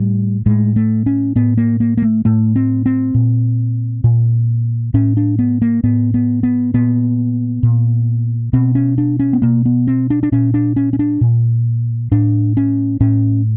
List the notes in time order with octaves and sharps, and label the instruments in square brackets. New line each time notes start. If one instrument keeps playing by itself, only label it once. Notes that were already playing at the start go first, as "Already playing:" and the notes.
Already playing: [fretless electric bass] A2 G3
A2 G#3
A3
C#4
A2 B3
A#3
A#3
A#3
A3
A2 A3
C4
C4
A#2
A#2
A2 C#4
D4
B3
A#3
A2 B3
B3
B3
A#2 B3
A#2
B2 C4
C#4
D4
C#4
B3
B2 A#3
B3
C4
D4
D4
A#2 C#4
D4
C#4
C#4
D4
A#2
A2 D4
C#4
A2 C#4